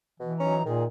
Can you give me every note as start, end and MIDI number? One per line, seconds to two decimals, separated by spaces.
0.19 0.34 47
0.19 0.63 52
0.40 0.63 54
0.40 0.56 61
0.40 0.63 63
0.40 0.63 82
0.66 0.85 46
0.66 0.86 51
0.66 0.83 68